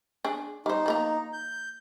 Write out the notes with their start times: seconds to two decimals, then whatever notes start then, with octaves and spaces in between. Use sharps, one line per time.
0.25 D4 G#4
0.66 G3 D#4 C5
0.86 F3 A#3 A#5
1.33 G6